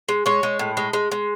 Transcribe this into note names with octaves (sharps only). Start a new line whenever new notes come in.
G#3
G#3 C#5
G#3
A2
G#3
G#3
G#3